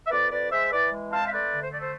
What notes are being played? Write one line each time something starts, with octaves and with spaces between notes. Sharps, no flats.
E5
F2 B4 D5
F2 B4 D5
G#3 C5 E5
E3 B4 D5
G#3
C4 F5 A5
E5
A3 B4 D5
D3
C5
A3 D5
A4 C5